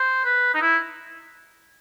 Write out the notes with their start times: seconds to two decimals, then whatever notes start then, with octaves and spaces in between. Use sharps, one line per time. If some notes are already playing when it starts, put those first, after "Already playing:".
Already playing: C5
0.24 B4
0.54 D#4
0.61 E4